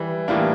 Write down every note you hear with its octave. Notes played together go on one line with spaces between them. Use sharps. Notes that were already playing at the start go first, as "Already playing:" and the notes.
Already playing: E3 G3
A2 E3 G3 A#3 D4